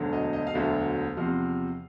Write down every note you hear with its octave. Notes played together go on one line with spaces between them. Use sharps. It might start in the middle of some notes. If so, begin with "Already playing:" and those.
Already playing: E1 D2 D3 F#3
D#5
D#5
F5
E1 D2 D3 F#3 E5
E2 C3 F3 F5